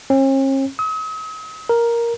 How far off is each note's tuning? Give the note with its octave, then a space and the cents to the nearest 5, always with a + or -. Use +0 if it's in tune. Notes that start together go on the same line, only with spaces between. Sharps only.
C#4 -45
D#6 +45
A#4 +5